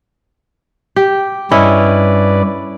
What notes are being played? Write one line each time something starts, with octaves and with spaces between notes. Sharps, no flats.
G4
G2 C#4 E4 B4 D5 D#5